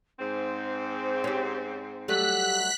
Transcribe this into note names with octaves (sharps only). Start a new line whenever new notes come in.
G#2 C4 C5
C#4 G4
F#3 G3 A3 G4 F#6 B6